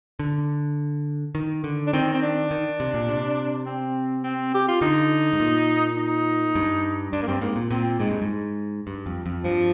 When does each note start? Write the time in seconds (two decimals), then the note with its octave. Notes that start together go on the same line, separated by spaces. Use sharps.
0.19 D3
1.35 D#3
1.64 D3
1.87 D4
1.93 D#3 C4
2.14 C4
2.22 D4
2.51 D#3
2.80 C3
2.94 A#2
3.09 C3
3.66 C4
4.24 C4
4.54 G4
4.68 F4
4.81 D3 D#4
5.33 G#2
5.40 A#2
5.97 D#4
6.55 G2
7.12 G2 D4
7.22 A#3
7.28 G2 C4
7.41 G#2 A#3
7.56 A#2
7.71 A#2 C4
8.00 G#2 G#3
8.11 G2
8.22 G#2
8.87 G2
9.06 F2
9.26 F2
9.44 G2 F3